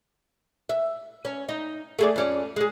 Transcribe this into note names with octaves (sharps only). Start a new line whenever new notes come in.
E5
C#4
D#4
A3 G#4 D5
F2 C#4 D5
G#3 G#4